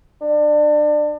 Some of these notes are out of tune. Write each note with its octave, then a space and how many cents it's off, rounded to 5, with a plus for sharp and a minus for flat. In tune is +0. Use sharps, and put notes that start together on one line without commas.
D4 +30